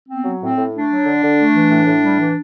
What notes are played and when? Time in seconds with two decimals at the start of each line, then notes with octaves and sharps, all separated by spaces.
0.08 B3 C4
0.25 F#3
0.41 A2 C4
0.57 A2
0.73 A3 D4
0.90 F#3
1.05 D3
1.22 D3
1.38 A3
1.54 E3
1.70 A2
1.86 A2
2.02 G3
2.19 E3